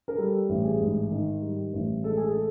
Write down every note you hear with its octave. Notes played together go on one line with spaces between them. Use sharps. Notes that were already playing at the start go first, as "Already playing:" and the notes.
A#4
G3 A4
A1
G#4
G#2
D#3
G3
A1
G#3 A4
G#4
A4